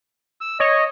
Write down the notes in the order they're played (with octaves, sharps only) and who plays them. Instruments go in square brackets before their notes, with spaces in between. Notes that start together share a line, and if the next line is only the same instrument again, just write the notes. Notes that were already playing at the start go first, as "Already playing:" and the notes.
[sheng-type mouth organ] E6
[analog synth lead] C#5 [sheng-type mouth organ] D#5